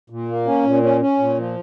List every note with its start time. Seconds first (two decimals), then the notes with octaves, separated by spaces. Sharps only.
0.10 A#2
0.28 A#3
0.46 C#4
0.64 A#2
0.83 C#4
1.01 C#4
1.19 A#2
1.37 F3